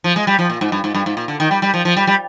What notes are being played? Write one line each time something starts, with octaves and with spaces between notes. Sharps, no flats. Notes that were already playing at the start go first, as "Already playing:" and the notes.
F3
G#3
G3
F3
A#2
G#2
G2
G#2
G2
G#2
A#2
D3
D#3
G3
G3
F3
F3
G3
G3